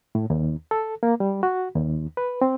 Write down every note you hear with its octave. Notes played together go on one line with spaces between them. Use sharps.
A2
D#2
A4
A#3
G3
F#4
D#2
B4
C4